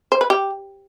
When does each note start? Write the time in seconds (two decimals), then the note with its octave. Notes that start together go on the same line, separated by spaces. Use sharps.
0.12 C5
0.21 B4
0.30 G4